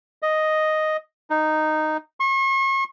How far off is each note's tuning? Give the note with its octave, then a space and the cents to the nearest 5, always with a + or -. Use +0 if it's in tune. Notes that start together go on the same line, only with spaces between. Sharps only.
D#5 +0
D#4 -10
C#6 -40